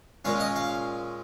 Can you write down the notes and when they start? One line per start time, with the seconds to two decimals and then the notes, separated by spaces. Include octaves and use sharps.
0.25 A#2 G#3 C#4 F5
0.40 D#5
0.56 F5